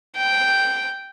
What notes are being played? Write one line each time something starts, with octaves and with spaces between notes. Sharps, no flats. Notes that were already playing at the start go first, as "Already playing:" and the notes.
G5